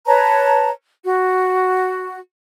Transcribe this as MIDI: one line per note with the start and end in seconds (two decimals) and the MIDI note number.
0.07 0.70 71
0.07 0.70 73
0.07 0.70 81
0.07 0.70 82
1.04 2.17 66